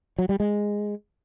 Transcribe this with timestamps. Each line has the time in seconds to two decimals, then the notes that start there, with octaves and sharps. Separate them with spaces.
0.19 F#3
0.29 G3
0.40 G#3